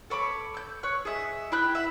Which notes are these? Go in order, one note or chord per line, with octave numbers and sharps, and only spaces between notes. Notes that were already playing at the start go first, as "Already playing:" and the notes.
A4 C#5 B5 D6
E6 G6
C#5 F#6
G#4 D#5 E5
E4 G5 B5 F#6
E5 F#5